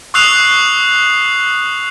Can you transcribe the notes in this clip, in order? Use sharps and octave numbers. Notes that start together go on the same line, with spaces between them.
C#6 D#6 E6 F#6 C7 F7